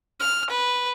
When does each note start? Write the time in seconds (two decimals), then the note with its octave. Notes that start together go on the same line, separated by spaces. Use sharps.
0.21 F6
0.50 B4